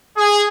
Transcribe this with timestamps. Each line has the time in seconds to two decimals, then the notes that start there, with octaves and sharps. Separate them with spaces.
0.17 G#4